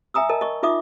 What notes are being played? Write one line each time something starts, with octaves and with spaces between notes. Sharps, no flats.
E5 G#5 A#5 D#6 E6
A#4 D#5 A5
D#5 C#6
D#4 F4 E5 D6 D#6